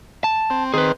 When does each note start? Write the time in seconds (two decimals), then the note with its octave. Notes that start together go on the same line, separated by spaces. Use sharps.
0.24 A5
0.50 C4
0.74 D#3 C4 G#4 B4